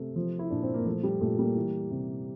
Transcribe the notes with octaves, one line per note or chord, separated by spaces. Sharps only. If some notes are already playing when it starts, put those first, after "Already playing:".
Already playing: C3 A3
F3
E4
A#2 D4
C4
A#3
F3 A3
G3
A#2 A3
G3 A#3
E3
C3